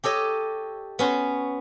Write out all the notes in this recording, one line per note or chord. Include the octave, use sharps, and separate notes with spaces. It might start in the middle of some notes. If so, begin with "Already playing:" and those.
G4 A4 C#5 D#5
B3 C#4 F#4 C6